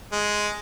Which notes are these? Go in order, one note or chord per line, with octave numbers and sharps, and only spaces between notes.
G#3